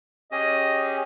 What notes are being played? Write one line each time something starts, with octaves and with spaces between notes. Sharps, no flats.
C#4 G4 G#4 D#5